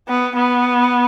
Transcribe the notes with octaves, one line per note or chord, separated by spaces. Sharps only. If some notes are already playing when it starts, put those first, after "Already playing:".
B3
B3